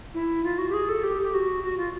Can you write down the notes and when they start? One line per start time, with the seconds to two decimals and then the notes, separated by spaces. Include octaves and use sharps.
0.14 E4
0.44 F4
0.58 F#4
0.69 G4
0.74 G#4
0.89 A4
1.03 G4
1.22 G4
1.34 F#4
1.63 F#4
1.78 F4